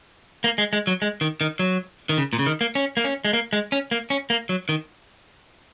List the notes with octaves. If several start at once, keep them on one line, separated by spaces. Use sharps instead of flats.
A#3
G#3
G#3
F#3
G#3
D#3
D#3
F#3
D#3
C#3
A#2
C#3
D#3
A#3
C#4
A#3
C#4
G#3
A#3
G#3
C#4
A#3
C#4
A#3
F#3
D#3